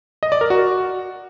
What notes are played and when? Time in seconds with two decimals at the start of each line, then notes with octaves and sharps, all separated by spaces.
0.23 D#5
0.32 D5
0.41 A#4
0.50 F#4